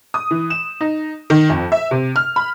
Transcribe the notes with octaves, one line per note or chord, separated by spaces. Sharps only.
D#6
E3
E7
D#4
D#3
F2
E5
C3
F6
B5